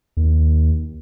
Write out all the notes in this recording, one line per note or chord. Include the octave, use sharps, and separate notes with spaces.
D#2